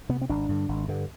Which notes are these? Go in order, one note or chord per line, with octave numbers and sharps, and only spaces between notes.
C3 B3
C4
G#1 D4
G2 D3
G#1
G2 D3